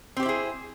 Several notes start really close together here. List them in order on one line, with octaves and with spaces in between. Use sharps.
C4 G4 C5 E4 G#4